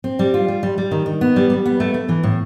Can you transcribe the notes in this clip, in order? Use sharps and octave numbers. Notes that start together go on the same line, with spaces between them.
C4
G3
F4
G3
G3
G3
D#3
D#3
B3
G3
G3
B3
A3
A3
E3
A2